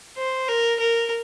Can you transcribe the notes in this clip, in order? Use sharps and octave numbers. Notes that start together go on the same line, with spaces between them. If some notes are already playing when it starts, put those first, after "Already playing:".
C5
A#4
A#4